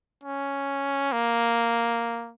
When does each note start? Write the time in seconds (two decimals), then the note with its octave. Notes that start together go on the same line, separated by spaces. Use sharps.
0.24 C#4
1.12 A#3